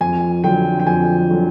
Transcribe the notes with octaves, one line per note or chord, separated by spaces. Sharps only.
F2 G#5
D3 F#3 G5
G5
F2 G#5
D3 F#3